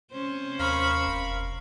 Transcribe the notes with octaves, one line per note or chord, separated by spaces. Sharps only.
C3 C#4 C5
D#2 A#4 F5 B5 C#6
F1